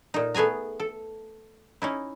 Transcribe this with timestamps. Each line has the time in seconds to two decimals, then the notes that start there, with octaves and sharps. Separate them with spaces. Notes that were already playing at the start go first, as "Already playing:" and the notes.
0.14 A#2 D#4
0.34 A3 B3 G#4 G#5 A#5
0.80 A4
1.82 C#4 D#4 E4